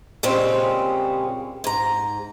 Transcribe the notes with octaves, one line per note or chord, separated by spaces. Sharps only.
A#2 C#3 G3 G#3 C4 C#4
G#2 A#5